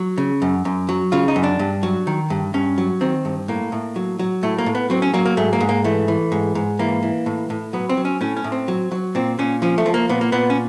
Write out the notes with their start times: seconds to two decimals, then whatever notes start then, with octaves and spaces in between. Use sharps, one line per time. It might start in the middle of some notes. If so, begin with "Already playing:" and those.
Already playing: F#3
0.18 C#3
0.42 F#2
0.65 F#2
0.89 F#3
1.12 C#3 F4
1.28 D#4
1.36 F#2
1.43 D4
1.59 G2
1.83 F#3
2.07 D#3
2.30 G2
2.54 G2 C#4
2.78 F#3
3.01 D#3 C4
3.25 G2
3.48 A2 A#3
3.72 A2
3.96 F#3
4.19 F#3
4.43 A2 A3
4.58 A#3
4.66 A2
4.75 B3
4.90 F#3 C4
5.02 C#4
5.14 F#3 A#3
5.25 A#3
5.37 G#2 A3
5.53 A#3
5.60 G#2
5.69 A#3
5.84 E3 A3
6.08 E3
6.32 G#2
6.55 G#2
6.79 E3 A#3
7.03 E3
7.26 A2
7.50 A2
7.73 F#3 B3
7.89 C4
7.97 F#3
8.05 C#4
8.21 A2 C#4
8.37 C#4
8.44 A2
8.52 C4
8.68 F#3
8.92 F#3
9.15 A#2 C4
9.39 A#2 C#4
9.62 F3 C#4
9.78 A3
9.86 F3
9.94 A#3
10.09 A#2 B3
10.21 A#3
10.32 A#2 B3
10.50 C#4